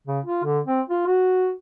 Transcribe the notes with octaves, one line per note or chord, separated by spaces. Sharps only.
C#3
F4
D3
C4
F4
F#4